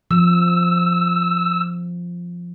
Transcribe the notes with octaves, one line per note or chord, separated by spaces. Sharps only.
F3 E6